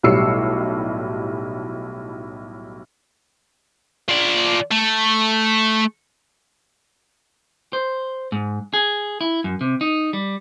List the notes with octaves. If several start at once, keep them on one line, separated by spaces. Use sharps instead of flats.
B1 A2 G3 E6 C7 C#7
F3 D5
A3
C5
G#2
G#4
E4
F#2
C3
D#4
G3